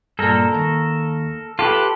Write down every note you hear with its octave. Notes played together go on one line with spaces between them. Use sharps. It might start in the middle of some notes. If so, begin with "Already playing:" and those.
G2 A#2 A4 A#4
D#2
F4 G4 A4 B4